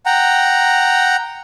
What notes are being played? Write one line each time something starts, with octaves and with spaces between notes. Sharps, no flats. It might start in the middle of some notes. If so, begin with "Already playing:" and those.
F#5 G5 A#5